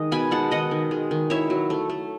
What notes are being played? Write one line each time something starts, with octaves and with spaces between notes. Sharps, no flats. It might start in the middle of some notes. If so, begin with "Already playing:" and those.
Already playing: D#3 G#3 D#4 D#5
B2 G#5 B5
G#3 F#5 A5
D#3 D#5 F#5
D#3
G#3
D#3
E4 C#5 E5
F#3
A3
A3